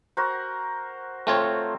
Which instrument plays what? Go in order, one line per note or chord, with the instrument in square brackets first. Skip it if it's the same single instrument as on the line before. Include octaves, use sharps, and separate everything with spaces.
[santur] F#4 A#4 C5
[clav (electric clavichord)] A3 F4 C#5 [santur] C4